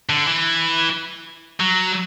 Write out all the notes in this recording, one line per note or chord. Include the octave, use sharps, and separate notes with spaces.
D3
E3
F#3